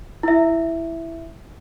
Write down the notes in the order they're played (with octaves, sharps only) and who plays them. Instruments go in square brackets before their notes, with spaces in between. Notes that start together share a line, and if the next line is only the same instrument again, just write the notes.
[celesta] E4 E5